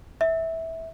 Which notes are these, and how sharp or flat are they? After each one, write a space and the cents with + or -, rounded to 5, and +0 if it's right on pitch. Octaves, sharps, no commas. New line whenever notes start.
E5 -15